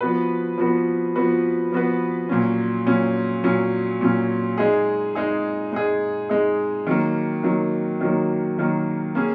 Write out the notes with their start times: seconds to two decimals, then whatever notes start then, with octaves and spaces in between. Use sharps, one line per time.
0.01 F3 B3 F#4 B4
0.58 F3 B3 F#4 B4
1.16 F3 B3 F#4 B4
1.72 F3 B3 F#4 B4
2.29 A#2 F#3 C#4
2.86 A#2 F#3 C#4
3.44 A#2 F#3 C#4
4.01 A#2 F#3 C#4
4.58 G#3 D#4 G#4
5.15 G#3 D#4 G#4
5.73 G#3 D#4 G#4
6.29 G#3 D#4 G#4
6.87 D#3 F#3 A#3
7.44 D#3 F#3 A#3
8.01 D#3 F#3 A#3
8.59 D#3 F#3 A#3
9.15 A#3 C#4 G#4